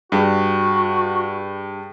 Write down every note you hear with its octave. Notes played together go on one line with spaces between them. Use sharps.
G2 F#4 G#4 G5 C#6